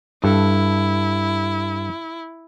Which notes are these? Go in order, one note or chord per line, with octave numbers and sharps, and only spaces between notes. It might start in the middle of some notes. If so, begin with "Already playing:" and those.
G2 E4 A4